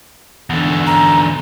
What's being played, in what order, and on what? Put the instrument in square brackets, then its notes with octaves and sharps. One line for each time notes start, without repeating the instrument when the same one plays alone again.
[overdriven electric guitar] E2 D3
[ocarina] A#5